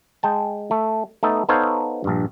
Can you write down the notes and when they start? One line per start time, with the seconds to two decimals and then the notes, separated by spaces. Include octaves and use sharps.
0.23 G#3 G5 A5
0.71 A3
1.23 A3 B3 D#4 A4
1.49 B3 D#4 A4 C5 C#5 F5
2.04 A#1 G2